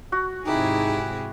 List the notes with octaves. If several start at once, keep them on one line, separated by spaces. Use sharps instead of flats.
F#4
G#1 C3 D#4 E4 G4 G#4